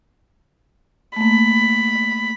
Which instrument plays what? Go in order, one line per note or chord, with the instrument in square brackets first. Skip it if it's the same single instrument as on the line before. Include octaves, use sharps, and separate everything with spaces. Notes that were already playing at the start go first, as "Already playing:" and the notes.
[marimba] A3 A#3 [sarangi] B5